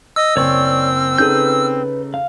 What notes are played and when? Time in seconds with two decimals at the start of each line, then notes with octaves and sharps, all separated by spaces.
0.16 D#5 E6
0.37 F#1 C4 C#5 D5 C#6
1.18 C#3 D#4 A4 B4 G6
2.14 F5